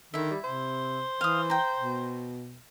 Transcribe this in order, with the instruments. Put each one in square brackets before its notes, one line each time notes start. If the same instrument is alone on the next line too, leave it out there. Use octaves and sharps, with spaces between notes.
[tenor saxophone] D3 [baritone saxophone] D#3 [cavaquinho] E4 E5
[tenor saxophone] G3
[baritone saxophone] C3 [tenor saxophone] C5
[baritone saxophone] E3 [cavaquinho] F5 D#6
[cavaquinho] G5 A#5
[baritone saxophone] B2